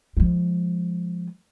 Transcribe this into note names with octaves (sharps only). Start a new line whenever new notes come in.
F3 G#3